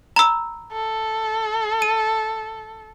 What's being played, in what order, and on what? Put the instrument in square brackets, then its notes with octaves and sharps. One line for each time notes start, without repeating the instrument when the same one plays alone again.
[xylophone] A#5 B5 E6
[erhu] A4
[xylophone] D#7